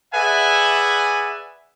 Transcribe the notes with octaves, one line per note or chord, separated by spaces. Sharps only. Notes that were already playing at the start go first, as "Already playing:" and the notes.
G#4 B4 D5 E5 F#5 G#5